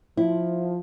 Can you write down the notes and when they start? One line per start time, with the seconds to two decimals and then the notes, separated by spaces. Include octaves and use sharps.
0.17 F3 E4